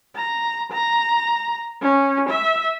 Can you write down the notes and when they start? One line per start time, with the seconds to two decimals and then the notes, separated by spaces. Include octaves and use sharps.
0.16 A#5
0.72 A#5
1.82 C#4
2.29 E5